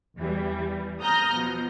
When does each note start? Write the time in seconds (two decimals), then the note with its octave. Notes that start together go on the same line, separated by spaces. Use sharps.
0.17 E2 E3 G3
1.01 A#5 D#6 F6 G6 A#6
1.33 B2 F3